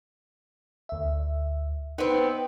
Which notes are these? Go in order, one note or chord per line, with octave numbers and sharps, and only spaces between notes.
D2 E5
B3 C4 D#4 B4